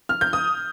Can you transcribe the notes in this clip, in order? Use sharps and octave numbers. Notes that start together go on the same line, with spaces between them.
F6
G6
D#6